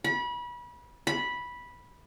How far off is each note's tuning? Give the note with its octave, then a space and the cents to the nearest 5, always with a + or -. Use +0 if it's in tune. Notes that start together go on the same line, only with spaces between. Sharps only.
B5 -30
B5 -10